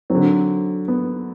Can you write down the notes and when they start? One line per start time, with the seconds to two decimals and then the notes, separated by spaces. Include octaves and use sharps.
0.10 D3 F#3 C4
0.88 B3